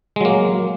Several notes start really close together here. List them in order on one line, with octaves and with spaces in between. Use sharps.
G#3 F#3 A#3